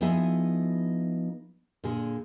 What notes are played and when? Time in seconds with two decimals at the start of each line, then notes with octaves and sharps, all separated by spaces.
0.01 F3 B3 D#4 E4 G#4 E5
1.84 A#2 D3 G#4